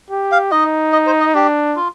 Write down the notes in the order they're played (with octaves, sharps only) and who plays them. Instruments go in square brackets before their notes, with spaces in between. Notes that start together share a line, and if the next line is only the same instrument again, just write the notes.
[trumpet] G4
[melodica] F5
[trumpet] D#4 [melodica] D#5
[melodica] D#5
C5
D#5
[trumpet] D4 [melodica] G4
[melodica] F4